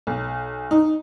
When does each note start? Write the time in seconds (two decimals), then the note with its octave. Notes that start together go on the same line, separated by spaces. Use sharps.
0.07 B1
0.71 D#4